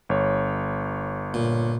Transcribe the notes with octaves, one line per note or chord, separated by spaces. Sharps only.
G1 C#5
A#2